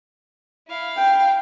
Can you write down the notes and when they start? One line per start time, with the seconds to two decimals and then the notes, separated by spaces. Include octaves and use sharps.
0.68 E4 F5
0.97 G5